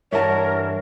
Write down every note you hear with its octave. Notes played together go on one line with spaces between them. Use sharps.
G2 E3 D4 A#4 C#5 E5 F#5 A5